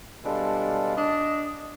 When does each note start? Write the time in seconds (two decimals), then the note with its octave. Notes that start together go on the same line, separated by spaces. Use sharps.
0.24 B2 G3 G#3 D4 F4 A4
0.97 D4 D#5